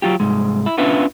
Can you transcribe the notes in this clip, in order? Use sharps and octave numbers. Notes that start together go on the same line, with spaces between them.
F#3 F4 G4
C2 G#2 G#3
E4
B3 C#4 D4 F4 B4 E5